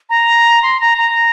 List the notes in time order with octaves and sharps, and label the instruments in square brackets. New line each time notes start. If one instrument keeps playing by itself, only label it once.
[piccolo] A#5
C6
A#5
A#5